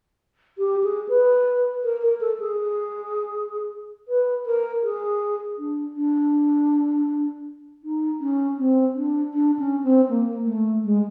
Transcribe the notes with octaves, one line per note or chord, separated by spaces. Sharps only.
G4
G#4
B4
A#4
A#4
A4
G#4
B4
A#4
G#4
D4
D4
D#4
C#4
C4
D4
D4
C#4
C4
A#3
A3
G#3